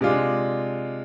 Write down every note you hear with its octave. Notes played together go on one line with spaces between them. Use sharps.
C3 G#3 D4 F4